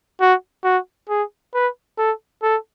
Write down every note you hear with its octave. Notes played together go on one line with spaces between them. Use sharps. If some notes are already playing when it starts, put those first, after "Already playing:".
F#4
F#4
G#4
B4
A4
A4